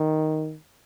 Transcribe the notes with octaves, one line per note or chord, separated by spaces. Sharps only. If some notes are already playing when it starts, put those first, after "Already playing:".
Already playing: D#3